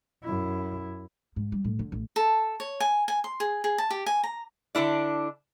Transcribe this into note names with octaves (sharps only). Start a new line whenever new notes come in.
F#2 E4
G#2
G3
A2
D3
A1
A4
C#5
G#5
G#5
C6
G#4
G#4
A5
G4
G#5
A#5
D3 D4 E4 D5